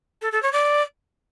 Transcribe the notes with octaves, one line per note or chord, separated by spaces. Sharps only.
A4
A4
C#5
D5